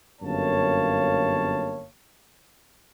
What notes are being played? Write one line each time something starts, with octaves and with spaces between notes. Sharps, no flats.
G1 F#2 A#3 C#5 F5 A5